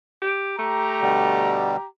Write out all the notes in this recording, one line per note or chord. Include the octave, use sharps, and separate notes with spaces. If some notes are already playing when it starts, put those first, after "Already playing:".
G4
A3 G4 A#5
B2 D3 G3